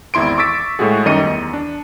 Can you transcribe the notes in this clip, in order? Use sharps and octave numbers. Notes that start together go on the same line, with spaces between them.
G#1 E2 E4 C6 D7
C#6 D6 E6 A6 B6 D7
A2 G#3 A3 F#4 G#4
F#2 D#3 G3 D#5 C#7 D#7
E2
D4